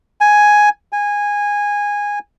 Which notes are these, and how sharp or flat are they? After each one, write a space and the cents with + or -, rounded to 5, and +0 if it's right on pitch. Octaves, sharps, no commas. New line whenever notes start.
G#5 +5
G#5 -15